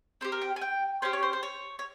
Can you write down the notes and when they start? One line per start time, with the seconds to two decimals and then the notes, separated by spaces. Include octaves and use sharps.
0.21 C4 G4 C5
0.32 A#4
0.41 G5
0.56 G#5
0.61 G5
1.02 C#4 G4 C5
1.13 C#5
1.23 C5
1.33 C5
1.43 C#5
1.79 C#5